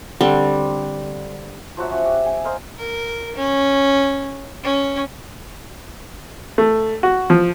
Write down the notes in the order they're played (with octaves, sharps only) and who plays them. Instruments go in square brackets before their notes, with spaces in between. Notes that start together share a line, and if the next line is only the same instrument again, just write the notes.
[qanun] D3 G3 C4 C6
[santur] F3 F#3 F#4 E5
C#4 F#4
G4
G#5
C5 D#5 F5 A#5
[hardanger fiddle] A#4
C#4
C#4
[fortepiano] A3
F#4
F3